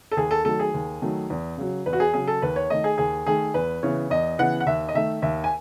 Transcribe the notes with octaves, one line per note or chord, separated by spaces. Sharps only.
A4
D#2 G#4
A4
D#3 F#3 A3 A4
G#4
D#2
D#3 F#3 A3
E2
C#3 F#3
E2 B4
F#4
G#4
C#3 F#3 G#4
A4
D#2 B4
C#5
D#3 A3 D#5
G#4
D#2 G#4
D#3 A3 G#4
E2 B4
C#3 E3 B3 C#5
E2 D#5
C#3 E3 B3 F#5
F#5
D#2 E5
D#5
D#3 A3 E5
D#2 E5
G#5